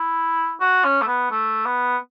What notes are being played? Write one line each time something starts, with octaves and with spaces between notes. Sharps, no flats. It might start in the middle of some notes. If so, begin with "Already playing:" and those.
Already playing: E4
F#4
C#4
A3
B3
A3
B3